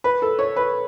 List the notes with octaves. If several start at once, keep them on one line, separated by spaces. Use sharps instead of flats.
B4
A4
C#5
B4